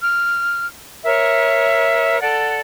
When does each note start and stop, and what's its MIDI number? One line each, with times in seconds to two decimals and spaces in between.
0.01 0.65 89
1.04 2.20 70
1.04 2.20 73
1.04 2.20 76
2.20 2.59 69
2.20 2.59 74
2.20 2.59 78